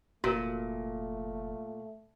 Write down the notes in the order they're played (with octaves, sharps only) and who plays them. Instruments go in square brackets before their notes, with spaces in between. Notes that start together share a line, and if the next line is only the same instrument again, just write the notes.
[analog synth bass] F1 [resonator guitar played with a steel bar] A#2 [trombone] A3 [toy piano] F#4 A#4